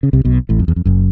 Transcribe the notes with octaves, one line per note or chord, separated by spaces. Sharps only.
C#3
C2 C3
B1 B2
A1 A2
F2
E2
F2
F#1 F#2